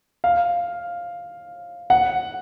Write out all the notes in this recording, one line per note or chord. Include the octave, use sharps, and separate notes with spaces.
F5
F#5